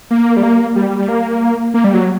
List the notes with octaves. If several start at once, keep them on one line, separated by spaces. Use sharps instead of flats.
A#3
G3
A#3
G3
G3
A#3
A#3
G3
F#3